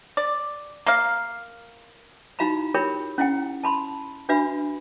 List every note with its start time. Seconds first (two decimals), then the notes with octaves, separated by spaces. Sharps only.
0.17 D5
0.86 A#3 F5
2.39 D#4 E4 F#4 F5 A#5 B5
2.74 F4 G4 A#4 C#5 G5 B5
3.18 C#4 E4 F#5 G5
3.64 A5 B5 C6
4.29 D4 F#4 B4 E5 B5